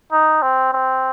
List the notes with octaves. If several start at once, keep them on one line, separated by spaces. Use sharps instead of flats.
D#4
C4
C4